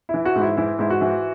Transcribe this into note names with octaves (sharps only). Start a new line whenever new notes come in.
E3 E4
F#4
G#2
E4
E3 E4
G#2 E4
F#4
E3